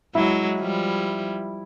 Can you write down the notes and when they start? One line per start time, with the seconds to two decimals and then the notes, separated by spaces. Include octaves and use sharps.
0.15 F#3 G#3 E4
0.60 F3 G3